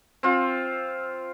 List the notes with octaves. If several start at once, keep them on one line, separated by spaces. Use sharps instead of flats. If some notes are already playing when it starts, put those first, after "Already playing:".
C4 F4